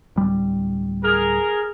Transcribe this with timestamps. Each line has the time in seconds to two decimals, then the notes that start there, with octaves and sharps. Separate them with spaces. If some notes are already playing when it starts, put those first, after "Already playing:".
0.16 D1 G3
1.03 G#4 A#4